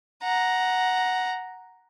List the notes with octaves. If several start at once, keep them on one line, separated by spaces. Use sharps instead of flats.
F#5 A#5